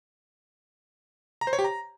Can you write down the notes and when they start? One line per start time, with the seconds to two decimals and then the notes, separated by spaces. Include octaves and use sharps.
1.41 A#5
1.47 C5
1.53 C#5
1.59 G4
1.64 A#5